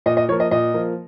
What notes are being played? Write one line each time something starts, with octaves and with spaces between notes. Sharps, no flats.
A#2 D#5
D#5
F3 A#3 C#5
D#5
A#2 D#5
F3 A#3